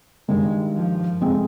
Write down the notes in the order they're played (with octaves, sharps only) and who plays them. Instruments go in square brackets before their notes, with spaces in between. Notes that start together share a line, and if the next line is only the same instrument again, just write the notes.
[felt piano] G2 D#3 G3 [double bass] G#3
[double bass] F3
[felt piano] F2 C3 F3 G#3 C4